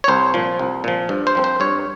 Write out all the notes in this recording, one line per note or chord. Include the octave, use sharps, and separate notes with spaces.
C#5
C2 C5
A#2 F3
C2
A#2 F3
G2
C5
F3 C4
C5
G2 C#5